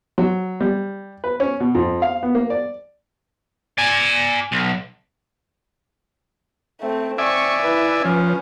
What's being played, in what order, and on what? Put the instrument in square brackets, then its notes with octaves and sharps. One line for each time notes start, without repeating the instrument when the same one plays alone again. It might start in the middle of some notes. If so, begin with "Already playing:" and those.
[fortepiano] F#3
G3
B4
C#4
B2
F2
F5
B3
A#3
D5
[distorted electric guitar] D5 G#5
B1
[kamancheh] A3 C4
[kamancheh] C4 C#6 [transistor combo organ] D5 E5 G#5
[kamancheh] E4 B4
[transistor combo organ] F3 [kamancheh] C#4 B4